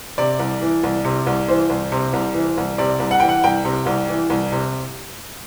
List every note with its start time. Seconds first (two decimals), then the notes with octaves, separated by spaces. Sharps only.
0.18 C3 D5
0.39 C2
0.61 E3
0.83 C2
1.05 C3
1.27 C2
1.48 E3 C5
1.70 C2
1.92 C3
2.13 C2
2.35 E3
2.57 C2
2.78 C3 D5
3.00 C2
3.11 F#5
3.20 E3 G5
3.29 F#5
3.44 C2 G5
3.65 C3
3.86 C2
4.09 E3
4.30 C2
4.52 C3